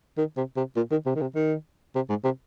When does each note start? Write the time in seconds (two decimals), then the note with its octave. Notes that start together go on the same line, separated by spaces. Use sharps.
0.18 D#3
0.37 C3
0.57 C3
0.76 A#2
0.92 D#3
1.06 C3
1.16 D#3
1.22 C3
1.35 D#3
1.95 C3
2.10 G#2
2.24 C3